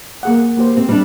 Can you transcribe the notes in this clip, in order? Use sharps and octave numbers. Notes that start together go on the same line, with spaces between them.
A#3 G#4 F#5
A#3 G4 C5
C4
G3 D4